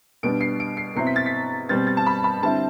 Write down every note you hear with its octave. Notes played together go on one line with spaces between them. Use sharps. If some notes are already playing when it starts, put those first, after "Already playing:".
B2 G3 B3 D4 D7
C7
D7
C7
B2 F#3 C4 E4 C7
B6
A6
B6
B2 G3 C4 A6
A6
A5
B5
B5
D3 G3 C4 E4 A5